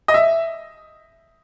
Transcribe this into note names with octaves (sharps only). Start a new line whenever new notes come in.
D#5
E5